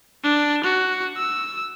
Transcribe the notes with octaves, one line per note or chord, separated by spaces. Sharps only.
D4
F#4
E6